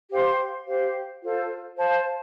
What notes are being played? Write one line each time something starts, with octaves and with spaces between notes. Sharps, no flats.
G4 C5 F5 C6
G4 C5 F5
F4 A4 C5
C5 F5 A5